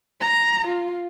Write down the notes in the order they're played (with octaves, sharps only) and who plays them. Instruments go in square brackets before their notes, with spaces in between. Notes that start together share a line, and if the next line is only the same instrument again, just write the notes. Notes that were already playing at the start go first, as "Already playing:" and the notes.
[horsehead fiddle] A#5
F4